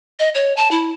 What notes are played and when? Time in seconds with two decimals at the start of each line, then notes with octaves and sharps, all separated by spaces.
0.19 D#5
0.35 C#5
0.57 A5
0.71 E4